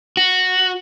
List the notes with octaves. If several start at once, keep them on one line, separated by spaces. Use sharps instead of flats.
F#4